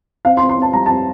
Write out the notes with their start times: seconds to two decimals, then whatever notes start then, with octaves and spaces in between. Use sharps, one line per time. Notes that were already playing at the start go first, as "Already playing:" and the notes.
0.25 C4 F5
0.37 C6
0.41 C4
0.49 C6
0.58 C4 A5
0.73 G3 A#5
0.86 A5
0.89 C4